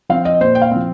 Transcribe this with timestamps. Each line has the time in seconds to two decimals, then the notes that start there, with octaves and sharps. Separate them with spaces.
0.09 F3 C4 F5
0.25 D#5
0.41 A#2 C5
0.55 G5
0.62 F5
0.71 F3 C4